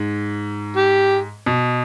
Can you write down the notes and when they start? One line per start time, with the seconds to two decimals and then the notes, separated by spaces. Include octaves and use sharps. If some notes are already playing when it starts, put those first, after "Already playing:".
Already playing: G#2
0.76 G4
1.46 B2